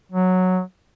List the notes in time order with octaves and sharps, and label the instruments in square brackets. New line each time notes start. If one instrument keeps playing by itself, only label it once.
[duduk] F#3